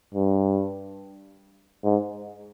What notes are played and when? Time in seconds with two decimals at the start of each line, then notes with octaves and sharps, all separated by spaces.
0.14 G2
1.84 G#2